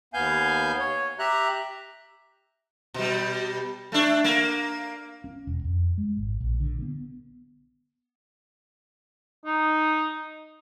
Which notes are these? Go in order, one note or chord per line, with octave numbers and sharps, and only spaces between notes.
D#2 B3 F5 G#5 G6
C#5
G4 E5 A#5 F#6
B2 G3
A3 D4
A#3
C#4
E1
F2
G#3
G#1
A#1
D3
B3
D#4